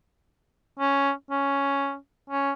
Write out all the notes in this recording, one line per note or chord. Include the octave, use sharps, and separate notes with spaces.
C#4
C#4
C#4